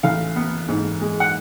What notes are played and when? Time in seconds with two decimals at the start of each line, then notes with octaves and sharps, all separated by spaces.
0.03 A1 F5
0.36 B3
0.68 G#2
1.01 G#3
1.20 F#5